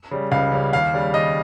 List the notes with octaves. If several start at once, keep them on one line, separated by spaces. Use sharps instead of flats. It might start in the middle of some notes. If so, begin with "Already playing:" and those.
C#3 G3
C#2 F5
C#3 G3
D#2 F5
C#3 G3
D#2 D#5